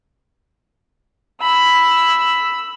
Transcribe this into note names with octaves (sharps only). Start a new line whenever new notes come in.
B5 E6